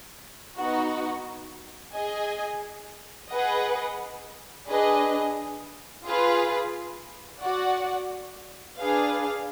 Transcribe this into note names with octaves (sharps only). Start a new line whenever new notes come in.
B3 D#4 F#4
G#4 D#5 G#5
G#4 B4 D#5 F#5
D4 G#4 B4 D#5
F4 G#4 B4 F5
F#4 D5 F#5
D4 G#4 B4 F5